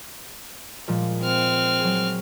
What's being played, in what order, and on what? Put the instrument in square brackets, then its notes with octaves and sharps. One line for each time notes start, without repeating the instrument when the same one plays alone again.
[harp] A#2 F3 G#3
[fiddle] C4 F6
[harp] F#3 G#4